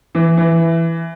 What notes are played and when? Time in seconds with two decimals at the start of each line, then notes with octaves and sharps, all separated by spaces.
0.15 E3
0.37 E3